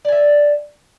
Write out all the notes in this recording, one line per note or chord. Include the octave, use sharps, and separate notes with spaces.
D5 E5 G#5